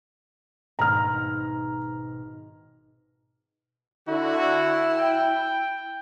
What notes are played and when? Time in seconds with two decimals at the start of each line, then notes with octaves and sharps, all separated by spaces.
0.79 G#1 G#2 B2 A#5 F6
4.08 D3 E4 F#4
4.98 G5